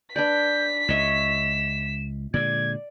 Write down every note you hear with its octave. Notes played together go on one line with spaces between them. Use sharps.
D4 B4 D5 G6 B6
C#2 C#5 D#5 E5 E7
A#2 D3 G#3 D5 G#6